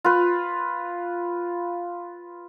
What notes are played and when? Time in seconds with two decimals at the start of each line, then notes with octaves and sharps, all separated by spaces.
0.05 F4 B4